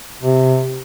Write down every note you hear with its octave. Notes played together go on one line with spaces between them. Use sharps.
C3